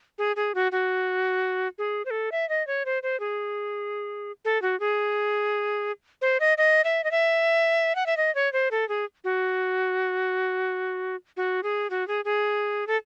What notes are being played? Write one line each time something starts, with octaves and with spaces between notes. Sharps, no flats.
G#4
G#4
F#4
F#4
G#4
C5
A4
E5
D#5
C#5
C5
C5
G#4
A4
F#4
G#4
C5
D#5
D#5
E5
D#5
E5
F#5
E5
D#5
C#5
C5
A4
G#4
F#4
F#4
G#4
F#4
G#4
G#4
A4